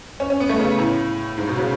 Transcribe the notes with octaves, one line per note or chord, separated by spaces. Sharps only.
C#4
C#4
B3
A3
C#3
A2
G#2
B2
C#3